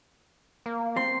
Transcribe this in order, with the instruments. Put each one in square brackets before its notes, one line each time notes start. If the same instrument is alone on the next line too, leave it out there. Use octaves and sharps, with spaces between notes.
[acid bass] A#3
[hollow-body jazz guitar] C4 [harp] C6